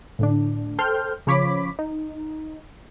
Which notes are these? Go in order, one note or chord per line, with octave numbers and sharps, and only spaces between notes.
A2 D3 D4
A4 C5 G5 C6 F6 G6
C#3 F3 C#5 B5 D6 B6
D#4